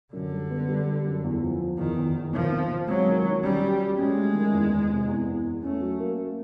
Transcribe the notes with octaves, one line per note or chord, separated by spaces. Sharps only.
F#2 D3
G3
B3
G3
G3
F#2
E2
F3
F3
E2 D#3
E2
E2
D#3 F3
C4
C4
F#3 G#3
D#3
D#3
G3 C#4
F#3
F#3
G#3 C#4
A3
D#3
E2
E2
C3
E2
E2
E2
A3 C#4
F#3
A#3
A#3